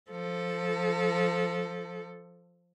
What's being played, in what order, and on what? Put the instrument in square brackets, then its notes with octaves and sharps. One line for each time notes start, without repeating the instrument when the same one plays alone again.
[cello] F3 A4